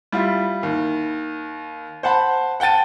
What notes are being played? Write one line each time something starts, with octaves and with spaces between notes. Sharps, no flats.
G3 E4 F4
D#2
C5 F#5 A5 B5
F#5 G5 A5 A6 D#7